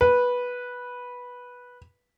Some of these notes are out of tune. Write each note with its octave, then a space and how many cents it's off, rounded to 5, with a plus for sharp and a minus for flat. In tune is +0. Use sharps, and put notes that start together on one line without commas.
B4 -10